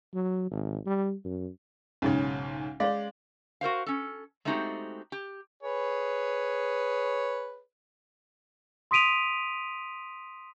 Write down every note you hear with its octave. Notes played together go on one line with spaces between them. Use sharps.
F#3
G#1
G3
F#2
B1 G#2 C#3 C#4
G#3 C#5 D5 F5
F#4 A#4 C5 F5
C#4 A4
G#3 A3 C4 D#4 F#4 G4
G4
G#4 B4 C#5
C6 D#6 B6 D7 D#7 F7